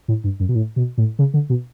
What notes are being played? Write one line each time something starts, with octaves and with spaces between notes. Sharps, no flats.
A2
G2
F#2
B2
A2
B2
A2
C#3
D3
B2